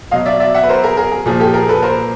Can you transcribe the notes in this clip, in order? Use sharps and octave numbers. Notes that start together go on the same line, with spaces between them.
B2 F#3 D#5 F5
D5 E5
D5 E5
E5 F#5
B4
A#4 C5
G#4 A#4
G#4 A#4
G#4
A#2 F3 G#4
G4 A4
G#4 A#4
A4 B4
A#4 C5